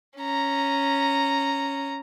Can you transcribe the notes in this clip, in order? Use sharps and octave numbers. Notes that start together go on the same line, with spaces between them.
C#4 A#5